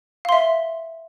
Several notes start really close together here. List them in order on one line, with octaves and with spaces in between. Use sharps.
F5 C6 E5